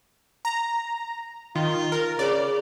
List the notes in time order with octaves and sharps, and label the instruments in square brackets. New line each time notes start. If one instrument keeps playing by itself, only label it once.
[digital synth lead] A#5
[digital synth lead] D#3 [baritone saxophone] F4
[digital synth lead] A#4
[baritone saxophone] C#3 [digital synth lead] D5